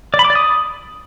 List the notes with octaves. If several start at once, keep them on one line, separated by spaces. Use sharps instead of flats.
D5
B5
D6
D5
D#6